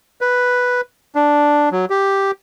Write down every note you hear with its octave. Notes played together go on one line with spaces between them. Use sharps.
B4
D4
F#3
G4